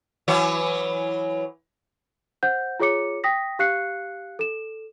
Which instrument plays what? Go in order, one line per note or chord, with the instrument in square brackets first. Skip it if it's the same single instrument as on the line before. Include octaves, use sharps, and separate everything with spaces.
[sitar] E3 F#3 C#5
[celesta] C5 F#5 G6
F4 G#4 C#5 D6 C#7
G5 D#6 A#6 B6
G4 F5 F#6 C7 C#7
A4 E7